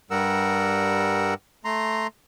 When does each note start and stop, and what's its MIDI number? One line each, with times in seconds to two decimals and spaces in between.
0.11 1.34 43
0.11 1.34 55
0.11 1.34 70
0.11 1.34 78
0.11 1.34 88
1.65 2.07 57
1.65 2.07 82
1.65 2.07 84